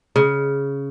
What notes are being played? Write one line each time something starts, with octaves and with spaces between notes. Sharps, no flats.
C#3